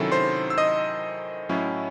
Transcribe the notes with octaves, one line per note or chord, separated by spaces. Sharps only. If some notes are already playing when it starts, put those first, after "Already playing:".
Already playing: C3 D#3 F#3 C#4 E4 A4
C5 C6
E6
D#5 D#6
A2 F#3 C#4 E4